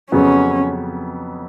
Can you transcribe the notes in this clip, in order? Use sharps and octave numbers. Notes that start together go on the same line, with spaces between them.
F2 C#3 F#3 B3 C#4